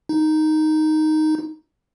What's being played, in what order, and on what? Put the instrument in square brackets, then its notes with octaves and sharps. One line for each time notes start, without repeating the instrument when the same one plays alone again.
[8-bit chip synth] D#4